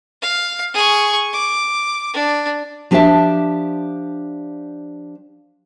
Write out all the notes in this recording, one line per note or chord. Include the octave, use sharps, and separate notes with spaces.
F5
G#4 C#6
D6
D4
F3 D4 G4 D5 E5 A5